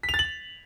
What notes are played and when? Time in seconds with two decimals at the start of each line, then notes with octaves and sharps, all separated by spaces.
0.03 B6
0.09 F7
0.14 A6
0.19 F#7